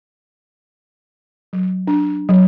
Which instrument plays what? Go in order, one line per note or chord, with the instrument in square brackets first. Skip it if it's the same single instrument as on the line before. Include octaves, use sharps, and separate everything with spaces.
[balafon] F#3
D4
F#3